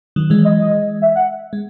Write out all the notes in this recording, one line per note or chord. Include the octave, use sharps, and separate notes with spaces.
D#3 F#3
E3 G#3
D#5
D#5
E5
F#5
G#3